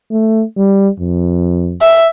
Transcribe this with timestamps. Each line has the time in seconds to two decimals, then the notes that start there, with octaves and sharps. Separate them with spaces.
0.11 A3
0.57 G3
1.00 F2
1.81 E5